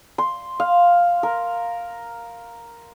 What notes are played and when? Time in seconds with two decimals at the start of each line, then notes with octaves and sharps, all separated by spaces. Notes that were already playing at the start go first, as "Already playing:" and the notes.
0.18 C6
0.60 F5
1.23 A#4